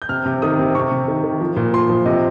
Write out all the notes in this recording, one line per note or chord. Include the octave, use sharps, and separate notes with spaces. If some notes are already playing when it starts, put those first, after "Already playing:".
G6
C3 F6
C3
D#3 D#6
C3
C3 C#6
C3
D#3
D#3
F3
A#2
A#2 C6
F3
C3 D#5